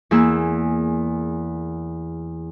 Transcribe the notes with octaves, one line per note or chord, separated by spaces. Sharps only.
E2 A#3 G#4 E6